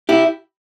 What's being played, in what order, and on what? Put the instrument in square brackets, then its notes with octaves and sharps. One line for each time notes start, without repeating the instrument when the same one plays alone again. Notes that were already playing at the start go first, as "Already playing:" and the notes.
[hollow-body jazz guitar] E4 G4